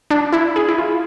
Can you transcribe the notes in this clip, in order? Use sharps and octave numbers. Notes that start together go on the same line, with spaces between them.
D4
E4
G#4
E4
F4